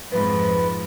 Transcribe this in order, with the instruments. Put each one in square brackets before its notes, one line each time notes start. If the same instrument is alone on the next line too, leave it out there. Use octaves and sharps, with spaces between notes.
[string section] F2 G#2 F3 [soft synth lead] B4